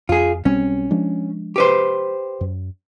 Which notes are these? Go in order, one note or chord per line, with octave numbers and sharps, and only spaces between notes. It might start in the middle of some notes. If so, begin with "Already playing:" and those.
F2 F4 G#4
B1 G3 C4 C#4
F3 G#3 D4
G4 B4 C5
F#2